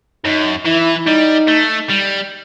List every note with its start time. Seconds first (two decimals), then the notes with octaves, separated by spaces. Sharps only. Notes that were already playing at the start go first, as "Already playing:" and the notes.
0.25 F#2 D#4
0.65 E3 E4
1.07 G3 D#4
1.48 A3
1.90 G3